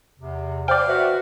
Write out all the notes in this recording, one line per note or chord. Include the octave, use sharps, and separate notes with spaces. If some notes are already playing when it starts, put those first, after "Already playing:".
E2 C3
C5 D5 F5 G5
F#4 B4 E5